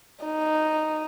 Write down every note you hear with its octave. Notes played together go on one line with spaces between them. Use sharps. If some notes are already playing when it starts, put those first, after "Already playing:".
D#4